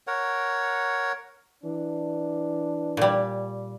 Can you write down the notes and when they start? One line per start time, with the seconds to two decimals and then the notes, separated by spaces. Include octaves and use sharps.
0.07 A#4 C#5 F#5
1.63 E3 D4
2.97 A#2 G3